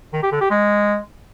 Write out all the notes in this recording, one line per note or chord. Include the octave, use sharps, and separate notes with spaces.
D#3
G4
D3
G4
G#3